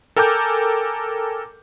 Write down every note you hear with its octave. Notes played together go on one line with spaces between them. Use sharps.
A4 A#4 G5 G#5 D6 G6